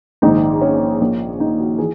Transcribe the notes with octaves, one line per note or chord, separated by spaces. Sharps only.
A#1 G#2 D#3 G#3 D#4
C#4
A#1 A#2 A#3
D#4
F#4
E3 G#4